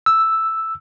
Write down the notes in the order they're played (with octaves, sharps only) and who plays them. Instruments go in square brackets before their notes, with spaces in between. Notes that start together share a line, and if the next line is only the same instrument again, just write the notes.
[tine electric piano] E6